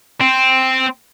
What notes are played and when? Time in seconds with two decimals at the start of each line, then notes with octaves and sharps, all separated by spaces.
0.21 C4